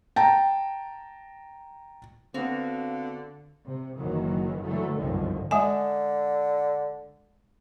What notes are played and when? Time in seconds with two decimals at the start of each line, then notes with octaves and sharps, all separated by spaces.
0.16 G5 A5 A#5
2.34 D3 B3 C4 F#4 F5
3.67 C3
3.99 F#1 D#3 E3 F#3
4.64 D3 E3 F#3 A3
4.97 G1 C2 F#2 D3 D#3 F3
5.51 D3 G#3 E5 G#5